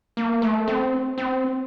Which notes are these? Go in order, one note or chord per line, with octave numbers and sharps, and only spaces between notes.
A#3
A3
C4
C4